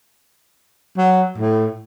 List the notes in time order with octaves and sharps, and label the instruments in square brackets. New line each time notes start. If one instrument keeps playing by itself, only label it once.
[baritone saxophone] F#3
A2